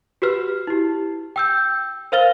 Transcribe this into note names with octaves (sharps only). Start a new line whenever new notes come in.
F#4 G4 B4 F6
E4 G4
G5 E6 G6
A#4 C5 F5 F6 A6 G7